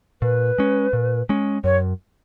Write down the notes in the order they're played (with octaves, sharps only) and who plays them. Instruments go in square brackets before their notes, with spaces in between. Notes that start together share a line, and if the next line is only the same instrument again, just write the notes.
[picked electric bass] A#2 [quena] B4
[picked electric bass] G#3 C#4
A#2
G#3 C#4
[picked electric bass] F#2 [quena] C#5